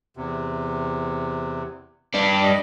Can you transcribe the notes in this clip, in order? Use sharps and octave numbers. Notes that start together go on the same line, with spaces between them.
E2 C3
G3 D4
D#5